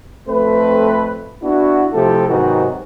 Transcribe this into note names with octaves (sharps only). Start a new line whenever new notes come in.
F2 A3 C4 B4
B3 D4 E4 F#4
C3 F3 A3 E4 G4 A4
G#2 C3 D#3 F#3 B3 F#4